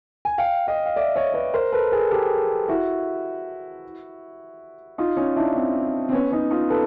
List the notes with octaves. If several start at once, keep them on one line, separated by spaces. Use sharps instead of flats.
G#5
F5 G5
D#5 F5
F5
D5 E5
C#5 D#5
B4 C#5
A#4 C5
A4 B4
G#4 A#4
G4 A4
E4 F#4
D#4 F4
C#4 D#4
D4 E4
C4
C4
B3 C#4
C#4 D#4
D#4 F4
A4 B4